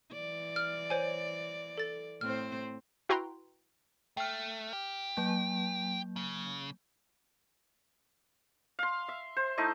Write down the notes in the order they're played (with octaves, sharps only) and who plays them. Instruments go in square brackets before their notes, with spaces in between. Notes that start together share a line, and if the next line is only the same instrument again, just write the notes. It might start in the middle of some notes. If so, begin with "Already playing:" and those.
[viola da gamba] E3 D5
[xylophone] F6
C5 C#5 G#5
A4 A6
[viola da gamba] A2 C4 C5 [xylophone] F6
[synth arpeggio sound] E4 F#4 B4 G5 A#5 C6
[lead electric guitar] A3 [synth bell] G5 F6
[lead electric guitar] G4
[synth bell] F#3 A#3 G6
[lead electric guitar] C#3
[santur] F5 C6
E5
C5
A3 D#4 E4 D#5